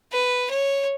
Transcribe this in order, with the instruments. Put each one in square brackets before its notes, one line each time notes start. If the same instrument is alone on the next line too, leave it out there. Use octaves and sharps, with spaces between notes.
[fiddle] B4
C#5